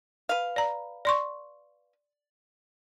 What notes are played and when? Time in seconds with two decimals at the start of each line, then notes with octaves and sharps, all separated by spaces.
0.29 B4 F5
0.56 D5 A#5
1.05 D5 C6 C#6